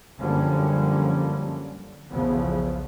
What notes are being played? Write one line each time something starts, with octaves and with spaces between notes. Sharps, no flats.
F#2 D3 F3 G3 A#3 C#4
B1 E2 C#3 F3 B3